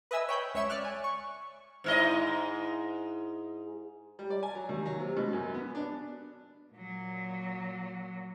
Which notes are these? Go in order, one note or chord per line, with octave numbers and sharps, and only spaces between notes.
B4 D#5 E5 G#5 E6
C#5 G5 B5 G6
C#2 C#5 E5 C#7 E7
D5 F6 F#6
G#5
C#6
G#2 E4 D#5
G3
D5
G#5
F#3
D#2
F#3
C3
B2
F#2
B3
D4
A#2 F#3